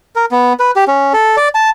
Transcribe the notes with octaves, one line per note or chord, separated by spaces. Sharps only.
A#4
B3
B4
G4
C#4
A4
D5
A5